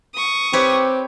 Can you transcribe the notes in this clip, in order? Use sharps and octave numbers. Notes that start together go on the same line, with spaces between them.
C#6 D#6
C4 G4 B4 C#5